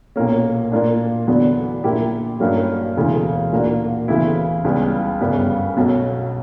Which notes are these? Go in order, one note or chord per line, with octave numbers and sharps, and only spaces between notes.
B1 A#2 A#3 C#4
A#2 A#3 D4
E2 D3 F#3 B3 D4
A#1 A#2 A#3 E4 G4
G2 F#3 A#3 C#4
E1 D2 C#3 E3
A#2 A#3 D4 F#4
D2 C#3 E3 B3 E4
C#2 C#3 G3 B3
G1 F#2 C#3 G3 B3
B1 B2 F#3 C#4